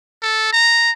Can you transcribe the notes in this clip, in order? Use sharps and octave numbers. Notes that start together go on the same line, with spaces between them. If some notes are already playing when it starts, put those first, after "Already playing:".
A4
A#5